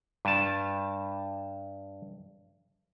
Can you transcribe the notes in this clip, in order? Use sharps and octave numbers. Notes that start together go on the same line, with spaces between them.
G2 A5